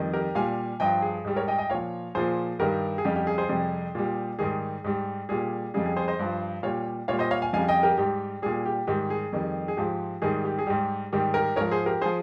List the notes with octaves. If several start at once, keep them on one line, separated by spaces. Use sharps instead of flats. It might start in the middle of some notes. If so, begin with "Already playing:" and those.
Already playing: F2 D#3 G3
G4 A#4
A#2 G3 F5 G#5
G2 F3 D#5 G5
G#4
G#2 G3
A#4 C#5
D#5 G5
D#5 G5
A#2 F3 C#5 F5
A#2 F3 G#4 C5
G2 D#3 G3 G4 A#4
G#4
F2 C#3 G3 G4
G4
G#4
G#4 C5
F2 C3 G3
A#2 G3
G#2 D#3 G3 G#4
G#2 G3
A#2 G3 G#4
F2 C#3 G3 G#4
G#4
G#4 C5
C5 D#5
G2 F3
A#2 G3 C#5 F5
A#2 G3 C#5 F5
C5 D#5
C#5 F5
F5 G#5
F2 C#3 G3 F5 G#5
D#5 G5
G4 A#4
G#2 G3 G4
A#2 G3 G#4
G4
G#2 D#3 G3 G4
G#4
F2 D#3 G3
G#4
G#2 F3 G4
G#2 D#3 G3 G#4
G4
G#4
G#2 G3 G4
G#2 D#3 G3 G4
G4 A#4
G#2 F3 A#4 C#5
G#4 C5
G4 A#4
F3 G#4 C5